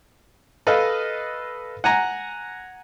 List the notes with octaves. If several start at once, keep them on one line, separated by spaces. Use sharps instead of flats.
A4 B4 D#5 F5
F#5 G#5 A#5